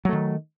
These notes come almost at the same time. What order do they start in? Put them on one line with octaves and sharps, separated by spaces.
F#3 A3 D#3